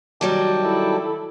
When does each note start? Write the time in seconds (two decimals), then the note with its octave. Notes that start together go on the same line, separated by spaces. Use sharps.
0.21 D#3 F#3 G3 G5 A5 D6
0.64 E4 A4